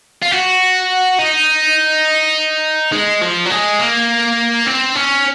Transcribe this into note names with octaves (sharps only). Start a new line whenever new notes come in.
F4
F#4
D#4
G#3
F3
F#3
G#3
A#3
C4
C#4